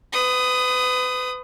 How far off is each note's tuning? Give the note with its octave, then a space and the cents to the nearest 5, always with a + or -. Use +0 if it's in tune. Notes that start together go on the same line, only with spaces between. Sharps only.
B4 +35 D#6 +0